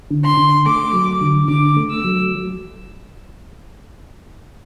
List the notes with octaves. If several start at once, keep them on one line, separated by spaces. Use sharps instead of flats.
D3
C6
D3
A3 D6
F#3
D3
D3 D6
A3
E6
F#3